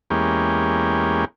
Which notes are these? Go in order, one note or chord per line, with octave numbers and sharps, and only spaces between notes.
E2 G#3 A#3 C#4 G4